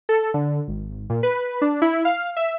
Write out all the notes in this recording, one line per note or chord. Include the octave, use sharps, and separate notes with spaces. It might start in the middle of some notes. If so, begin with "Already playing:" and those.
A4
D3
G#1
A#2
B4
D4
E4
F5
E5